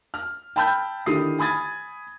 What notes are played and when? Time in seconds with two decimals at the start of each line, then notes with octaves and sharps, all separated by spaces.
0.14 F6
0.56 G5 A5 B5 E6 F6 G6
1.06 D3 D#3 E4 G4 D#6 C7
1.39 G#5 B5 D#6 G#6 A6